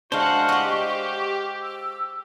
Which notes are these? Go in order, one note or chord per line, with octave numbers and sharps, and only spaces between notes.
G#3 D4 F#4 C5 F5 F#5 C#6
G4 D#5 F#5
E6